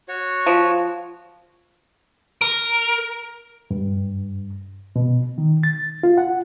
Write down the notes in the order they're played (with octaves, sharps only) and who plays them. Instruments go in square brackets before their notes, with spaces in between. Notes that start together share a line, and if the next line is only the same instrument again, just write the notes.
[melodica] F#4 C#5
[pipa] F3
[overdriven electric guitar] A#4
[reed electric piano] G2
B2
D#3
A6
F4
F#5